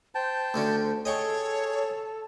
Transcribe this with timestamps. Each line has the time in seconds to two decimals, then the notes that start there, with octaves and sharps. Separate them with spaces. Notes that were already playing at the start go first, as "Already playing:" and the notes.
0.15 C5 G5 A5
0.54 D2 D3 C#4
1.05 G#4 A4 C#5 D#5 G5 C#6